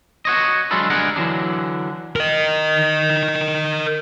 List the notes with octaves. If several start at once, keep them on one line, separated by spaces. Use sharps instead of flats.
F#4 C#5 D#5
F#3 G#3 D4 F4 A4 B4
D2 G2 G#3 G#4 A#4 F#5
D3 E3 F#3 D4
A#4 D#5